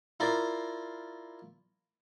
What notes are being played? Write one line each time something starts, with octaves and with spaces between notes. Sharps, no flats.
E4 F4 A#4 D5